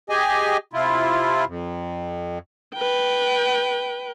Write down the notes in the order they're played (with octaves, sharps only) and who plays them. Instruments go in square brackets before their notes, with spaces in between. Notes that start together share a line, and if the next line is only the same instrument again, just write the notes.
[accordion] G4 G#4 D#5 G#5
C3 E4 F4
F2
[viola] B4 G5